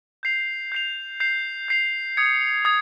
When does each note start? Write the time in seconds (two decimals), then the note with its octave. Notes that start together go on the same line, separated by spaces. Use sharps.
0.23 G6 C7 F7
0.72 G6 C7 F7
1.20 G6 C7 F7
1.68 G6 C7 F7
2.17 D#6 G#6 C#7
2.65 D#6 G#6